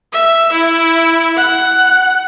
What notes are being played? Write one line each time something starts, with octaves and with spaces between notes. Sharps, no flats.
E5
E4
F#5